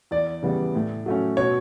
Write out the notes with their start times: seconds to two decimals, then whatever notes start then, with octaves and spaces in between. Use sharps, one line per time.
0.11 E2 D5
0.43 C#3 E3 G3 B3
0.75 A2
1.06 F#3 A3 C#4
1.37 B2 C#5